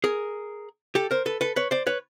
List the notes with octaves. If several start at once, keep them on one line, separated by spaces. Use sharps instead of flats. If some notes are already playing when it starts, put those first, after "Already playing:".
G#4 A#4
G4 A4
A#4 C5
A4 B4
A4 B4
B4 C#5
C5 D5
B4 C#5